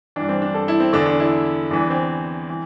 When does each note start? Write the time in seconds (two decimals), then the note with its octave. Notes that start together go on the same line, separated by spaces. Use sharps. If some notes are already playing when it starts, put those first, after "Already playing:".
0.16 G2 E3 D4
0.29 C4
0.42 D4
0.54 A4
0.68 E4
0.80 C4
0.93 E2 D3 D4
1.06 D4
1.20 E4
1.71 E2 E3 D4
1.90 C4
2.49 E3